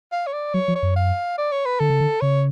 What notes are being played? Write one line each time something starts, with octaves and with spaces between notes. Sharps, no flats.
F5
C#5
D5
F#3 C#5
F3
C#5
F#2
F5
D5
C#5
B4
D3 A4
C#3
D3
C#3 C#5